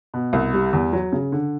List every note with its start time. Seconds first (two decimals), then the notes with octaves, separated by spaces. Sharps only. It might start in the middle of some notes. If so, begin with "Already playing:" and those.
0.14 B2
0.33 C2
0.54 G3
0.73 E2
0.93 F#3
1.12 C#3
1.32 D3